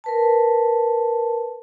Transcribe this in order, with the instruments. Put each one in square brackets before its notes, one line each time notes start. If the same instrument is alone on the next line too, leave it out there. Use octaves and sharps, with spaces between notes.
[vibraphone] A#4 B4 A5